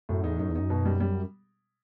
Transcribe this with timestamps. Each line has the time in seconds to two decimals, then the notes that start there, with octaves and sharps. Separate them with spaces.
0.09 F#2 A2
0.24 E2 D#4
0.39 F#2 D#4
0.49 E2
0.55 F#2 D#4
0.70 B2
0.85 G3
1.00 G3